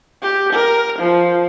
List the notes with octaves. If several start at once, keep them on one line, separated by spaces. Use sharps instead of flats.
G4
A#4
F3